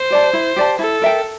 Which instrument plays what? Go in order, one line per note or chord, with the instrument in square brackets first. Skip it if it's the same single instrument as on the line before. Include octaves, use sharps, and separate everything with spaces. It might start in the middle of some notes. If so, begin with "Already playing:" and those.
Already playing: [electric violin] C5
[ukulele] G4 D5 A5
E4
G4 D5 A5
[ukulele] E4 [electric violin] A4
[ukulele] A#4 E5 G5